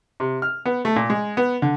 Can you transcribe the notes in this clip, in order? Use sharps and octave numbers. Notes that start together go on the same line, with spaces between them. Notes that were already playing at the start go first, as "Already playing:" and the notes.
C3
F6
B3
A3
A#2
G#3
B3
D3